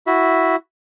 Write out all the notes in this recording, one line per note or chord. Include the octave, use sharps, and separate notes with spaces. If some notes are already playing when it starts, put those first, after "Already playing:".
E4 F#4 E5